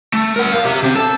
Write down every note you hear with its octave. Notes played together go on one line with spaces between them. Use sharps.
A3
A#4 F#5
F#2 F5
G4 E5
C3 C4
A4